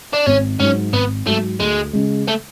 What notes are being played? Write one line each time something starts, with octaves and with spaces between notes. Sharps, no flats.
D4
G#1 C#4
G#2 F#3 C#4
G#1 B3
G#2 F#3 A3
D2 G#3
C#3 G#3
A3